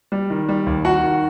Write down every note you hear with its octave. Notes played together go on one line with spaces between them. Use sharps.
G3
D#3
G3
D#2
D#3 F#4 F#5
D#3